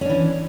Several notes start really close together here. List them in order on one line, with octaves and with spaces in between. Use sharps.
C#4 D4 E3